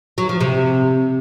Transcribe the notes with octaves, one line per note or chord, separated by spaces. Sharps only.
F#3
F3
C3